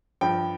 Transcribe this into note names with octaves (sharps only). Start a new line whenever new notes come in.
G2 F3 G5